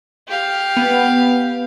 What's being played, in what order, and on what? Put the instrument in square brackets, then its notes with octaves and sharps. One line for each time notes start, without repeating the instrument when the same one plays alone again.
[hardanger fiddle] G4 F5
[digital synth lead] B3